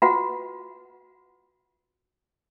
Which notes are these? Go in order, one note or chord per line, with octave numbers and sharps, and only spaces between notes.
F4 F#4 B4 F#5